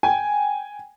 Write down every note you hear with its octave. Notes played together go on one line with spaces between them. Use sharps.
G5 G#5